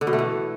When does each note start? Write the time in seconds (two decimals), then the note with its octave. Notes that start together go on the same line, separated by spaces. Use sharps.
0.01 D3
0.07 B2
0.13 A3
0.19 E3